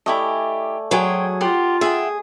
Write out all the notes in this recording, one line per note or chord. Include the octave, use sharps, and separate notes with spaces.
A3 E4 G4 D5 D#5 G#5
F#3 G#4 C5 G5
F4 G4 F#5 C6
G#4 E5 F#5 G5